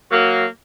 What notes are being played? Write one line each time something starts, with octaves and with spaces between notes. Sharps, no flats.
F#3 A#3